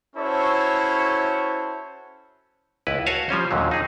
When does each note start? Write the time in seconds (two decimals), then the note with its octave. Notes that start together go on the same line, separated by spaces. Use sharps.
0.16 C#4 E4 F#4 A4 C5 C#5
2.87 C#2 E4 B4
3.06 F#4 C#5 F5 G#5 A5
3.29 F3 G3 C#4 C5
3.51 D#2 A#2 D3 F#3
3.71 D#4 G#4